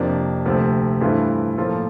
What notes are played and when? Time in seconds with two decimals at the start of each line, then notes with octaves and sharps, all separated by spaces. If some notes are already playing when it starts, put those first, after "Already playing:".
Already playing: F2 C3 F3 A#3 D4
0.45 D2 C3 F3 A3 C4
1.01 G2 E3 A3 C4 F4
1.58 A2 F3 A#3 F4 A4